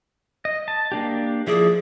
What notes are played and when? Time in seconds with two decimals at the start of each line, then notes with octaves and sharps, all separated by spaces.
0.45 D#5
0.68 A5
0.92 A#3 D4 G4
1.47 F3 E4 G#4 D5